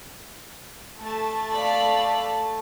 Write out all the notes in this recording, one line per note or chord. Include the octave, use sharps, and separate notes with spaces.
A3 A5
D5 F5 B5